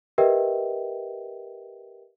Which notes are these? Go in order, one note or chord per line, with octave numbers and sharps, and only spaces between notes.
G4 A#4 B4 D#5 E5 G5